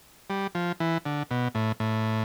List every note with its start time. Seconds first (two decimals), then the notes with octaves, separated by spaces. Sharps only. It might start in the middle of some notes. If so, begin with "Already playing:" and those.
0.30 G3
0.55 F3
0.80 E3
1.05 D3
1.31 B2
1.55 A2
1.80 A2